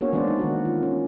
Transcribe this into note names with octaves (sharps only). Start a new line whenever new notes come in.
A#3 B3 D4 F#4 G#4 C#5
E3 G#3 D4 C5 D5
D#4
D#3 A#3 F#4
F4
C#4